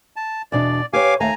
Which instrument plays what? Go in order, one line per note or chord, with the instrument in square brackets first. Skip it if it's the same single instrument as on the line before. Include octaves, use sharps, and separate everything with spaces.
[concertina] A5
[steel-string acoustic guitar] E2 B2 D4 [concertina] D5
[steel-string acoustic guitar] G4 B4 C#5 [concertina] F5 G#5 D6
[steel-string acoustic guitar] D#2 A3 F5 [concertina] G#5 A#5